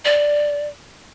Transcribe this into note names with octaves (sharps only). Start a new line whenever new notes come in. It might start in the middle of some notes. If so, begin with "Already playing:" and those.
D5